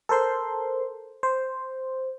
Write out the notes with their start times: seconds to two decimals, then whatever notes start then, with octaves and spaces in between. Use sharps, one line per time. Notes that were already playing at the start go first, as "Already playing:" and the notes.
0.09 A4 A#4 C5 C6
1.23 C5